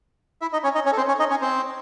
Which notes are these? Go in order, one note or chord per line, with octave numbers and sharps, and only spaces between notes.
E4 E5
D#4 D#5
C#4 C#5
D#4 D#5
C#4 C#5
A4
C4 C5
C#4 C#5
D#4 D#5
C#4 C#5
C4 C5